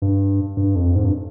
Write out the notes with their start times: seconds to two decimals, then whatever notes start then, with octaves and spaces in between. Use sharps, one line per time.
0.02 G2
0.57 G2
0.76 F2
0.95 G#2
1.04 G2